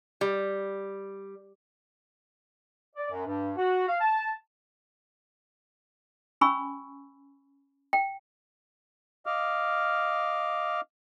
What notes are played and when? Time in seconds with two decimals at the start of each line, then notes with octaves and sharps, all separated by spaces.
0.21 G3
2.96 D5
3.10 F#2
3.26 G2
3.56 F#4
3.87 F5
4.01 A5
6.41 C#4 G#5 B5 C#6 E6
7.93 G5
9.26 D#5 F5 D6 F6